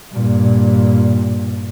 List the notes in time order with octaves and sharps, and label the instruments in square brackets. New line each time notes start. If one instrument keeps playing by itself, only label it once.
[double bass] G2 A#2